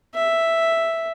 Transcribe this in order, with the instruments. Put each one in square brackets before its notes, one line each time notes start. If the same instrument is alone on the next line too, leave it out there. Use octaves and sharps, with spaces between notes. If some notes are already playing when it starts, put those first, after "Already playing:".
[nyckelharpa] E5